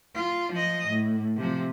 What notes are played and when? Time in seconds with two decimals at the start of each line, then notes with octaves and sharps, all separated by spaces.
0.15 F4
0.52 F3 D#5
0.89 A2
1.36 C3 F3